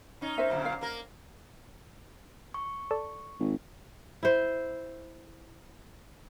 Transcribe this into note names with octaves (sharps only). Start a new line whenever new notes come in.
C#4 D#4
C5 E5
F#2 A#2 D3
F5
A#3 A#4
C#6
A4 D5 A5
G#1
E4 C5